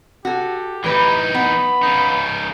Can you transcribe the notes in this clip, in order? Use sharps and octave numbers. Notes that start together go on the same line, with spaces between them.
F#4 G4 A4
A2 E3 D#4 B4
B3 B5
C#3 D#4